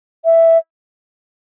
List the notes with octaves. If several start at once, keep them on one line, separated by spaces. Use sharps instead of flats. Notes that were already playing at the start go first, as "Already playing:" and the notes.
E5